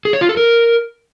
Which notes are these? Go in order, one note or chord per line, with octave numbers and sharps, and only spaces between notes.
G#4
C#5
F4
A4
A#4